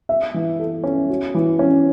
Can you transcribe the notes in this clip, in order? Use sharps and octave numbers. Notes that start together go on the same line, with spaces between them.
E5
E3
A4
C#4
F#4
E3
C#4